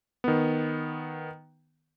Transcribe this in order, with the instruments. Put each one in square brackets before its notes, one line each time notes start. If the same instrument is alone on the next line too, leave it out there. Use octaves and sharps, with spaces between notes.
[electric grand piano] D#3 B3